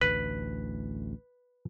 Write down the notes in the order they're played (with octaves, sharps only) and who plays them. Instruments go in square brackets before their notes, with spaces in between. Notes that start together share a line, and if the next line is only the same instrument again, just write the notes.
[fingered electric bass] A1 D2 [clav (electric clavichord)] B4